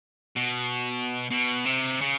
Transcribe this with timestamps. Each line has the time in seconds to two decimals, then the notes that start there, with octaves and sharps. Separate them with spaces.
0.36 B2
1.31 B2
1.65 C3
2.01 C#3